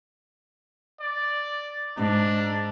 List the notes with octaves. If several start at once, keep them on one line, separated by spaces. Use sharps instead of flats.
D5
G#2 D4